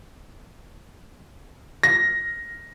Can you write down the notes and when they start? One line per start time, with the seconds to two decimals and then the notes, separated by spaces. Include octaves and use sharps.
1.83 A#6